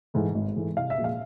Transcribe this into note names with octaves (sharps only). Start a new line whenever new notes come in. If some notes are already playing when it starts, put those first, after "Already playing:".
G#2 E3 A3
G#1
G#2 E3 A3
C2 F5
E5
A#2 F3 G#3
F5